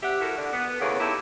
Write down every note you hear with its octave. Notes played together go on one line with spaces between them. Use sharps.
C3 G4 E5 F#5
E4 F#4 A4 A#4
D3
B3
E2 C#3 A3 A#3
D#4 E4 G4 A4